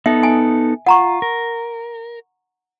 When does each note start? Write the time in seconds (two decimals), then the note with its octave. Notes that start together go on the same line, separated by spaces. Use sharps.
0.06 B3 D#4 A4 E5
0.23 G#5
0.86 F4 F#5 A#5 C#6
1.22 A#4